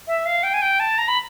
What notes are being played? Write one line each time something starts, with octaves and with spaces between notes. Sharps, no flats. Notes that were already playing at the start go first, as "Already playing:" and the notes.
E5
F5
G5
G#5
G5
A5
A#5
B5